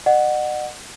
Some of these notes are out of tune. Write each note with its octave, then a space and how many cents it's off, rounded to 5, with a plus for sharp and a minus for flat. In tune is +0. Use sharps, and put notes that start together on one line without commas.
D#5 -45 F#5 +0